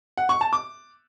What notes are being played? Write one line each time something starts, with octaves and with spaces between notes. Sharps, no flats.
F#5
C#6
A5
D6